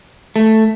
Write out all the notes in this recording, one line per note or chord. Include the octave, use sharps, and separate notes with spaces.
A3